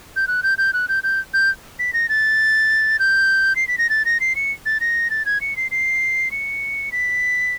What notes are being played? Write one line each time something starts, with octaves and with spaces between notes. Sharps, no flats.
G6
F#6
G6
G6
F#6
G6
G6
G6
B6
A#6
A6
G6
C7
B6
A#6
A6
A#6
C7
C#7
A6
A#6
A6
G#6
C#7
C7
C7
C#7
B6